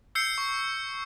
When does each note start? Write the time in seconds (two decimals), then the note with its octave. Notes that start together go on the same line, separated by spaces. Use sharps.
0.15 E6 G6 C7 C#7
0.38 C#6